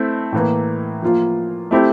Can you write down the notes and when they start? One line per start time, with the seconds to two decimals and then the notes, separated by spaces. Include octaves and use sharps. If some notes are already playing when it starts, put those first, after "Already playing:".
Already playing: A3 C4 E4
0.33 A2 E3 A#3
1.03 F3 A#3 F4
1.71 A3 C4 E4 G4